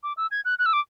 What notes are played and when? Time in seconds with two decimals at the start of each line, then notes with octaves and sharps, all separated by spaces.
0.03 D6
0.17 E6
0.31 G#6
0.45 F#6
0.59 F#6
0.66 E6
0.73 D6